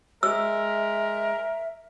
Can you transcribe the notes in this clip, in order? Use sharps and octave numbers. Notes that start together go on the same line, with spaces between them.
G#3 A#4 E5 E6